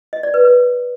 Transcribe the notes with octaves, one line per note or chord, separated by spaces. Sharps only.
D#5
D5
B4
B4